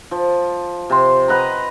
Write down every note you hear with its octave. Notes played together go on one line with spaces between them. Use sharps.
F3
C3 C6
B4 D#5 F#5 A#5